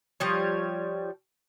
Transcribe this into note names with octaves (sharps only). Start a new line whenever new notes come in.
F3 G3 C#5